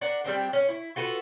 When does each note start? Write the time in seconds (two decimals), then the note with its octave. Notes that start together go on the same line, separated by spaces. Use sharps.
0.01 D4 A#4 F#5
0.24 G3 C4 D4 F4
0.53 C#4
0.69 E4
0.96 F4 F#4 A4 B4